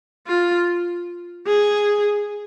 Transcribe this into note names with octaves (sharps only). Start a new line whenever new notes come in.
F4
G#4